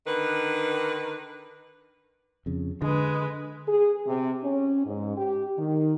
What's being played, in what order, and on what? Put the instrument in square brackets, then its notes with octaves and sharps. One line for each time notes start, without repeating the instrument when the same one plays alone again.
[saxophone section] D3 D#3 B4
[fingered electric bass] F2 C#3
[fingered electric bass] D3 [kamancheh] G#3 B4
[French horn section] G#4
C3
C#4
G#2
G4
D#3